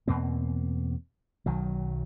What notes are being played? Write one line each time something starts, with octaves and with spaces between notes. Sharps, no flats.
E2 B2 A#3 C4
B1 D#3 F#3